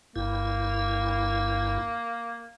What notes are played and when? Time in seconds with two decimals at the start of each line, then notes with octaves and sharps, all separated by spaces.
0.16 G1 G2 A#3 E4